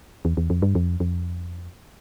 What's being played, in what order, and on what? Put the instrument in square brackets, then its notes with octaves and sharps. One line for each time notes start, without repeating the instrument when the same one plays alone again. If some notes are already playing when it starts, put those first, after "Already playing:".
[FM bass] E2
E2
F2
G2
F2
F2